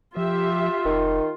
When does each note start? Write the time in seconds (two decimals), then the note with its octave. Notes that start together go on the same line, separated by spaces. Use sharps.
0.17 F3 F4 G4 E5
0.85 F1 D#3